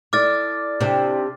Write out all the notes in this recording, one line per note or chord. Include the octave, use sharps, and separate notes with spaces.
E4 A4 D5 D6 F6 A6
C3 D4